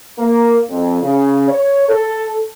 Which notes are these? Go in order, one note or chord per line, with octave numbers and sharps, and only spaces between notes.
A#3
F2
C#3
C#5
A4